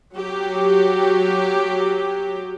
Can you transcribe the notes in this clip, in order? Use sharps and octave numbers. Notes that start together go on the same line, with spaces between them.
F#3 G4